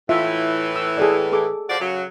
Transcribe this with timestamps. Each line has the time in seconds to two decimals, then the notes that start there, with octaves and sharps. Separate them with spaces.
0.09 A2 E3 F4 E5
0.76 E6
0.97 G#4 A4 D5
1.33 G#4 A4 D6
1.69 F3 F#4 D5
1.80 F#2 C#3 F#3